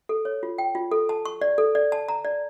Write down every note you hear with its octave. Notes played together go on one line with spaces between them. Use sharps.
A4
C#5
F4
G5
F4
A4
A5
C#6
D5
A4
D5
A5
A#5
D5